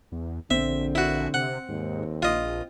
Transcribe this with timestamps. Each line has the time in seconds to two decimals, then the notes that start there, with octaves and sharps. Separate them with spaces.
0.12 E2
0.51 A#1 D3 C4 E5
0.95 E4 F#4
1.34 C3 F#5
1.69 D#2 G#2
2.22 A#1 F4 D#5